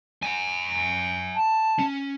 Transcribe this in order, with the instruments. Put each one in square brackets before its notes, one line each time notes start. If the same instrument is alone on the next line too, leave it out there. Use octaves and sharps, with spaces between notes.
[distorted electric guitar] F#5 G#5
[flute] A5
[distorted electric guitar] C#4